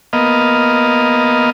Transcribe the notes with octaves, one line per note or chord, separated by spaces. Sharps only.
A#3 B3 D#5 F5